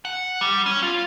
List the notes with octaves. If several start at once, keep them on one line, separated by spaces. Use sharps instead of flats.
F#5
G3
C#4
F4